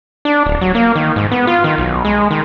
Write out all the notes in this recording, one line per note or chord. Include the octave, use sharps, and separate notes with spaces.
D4
D1
F#3
A#3
D#3
G#2
B3
F4
D#3
B1
G#3
D#3